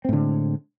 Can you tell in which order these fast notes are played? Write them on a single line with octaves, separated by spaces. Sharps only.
C4 A2 D3 G#3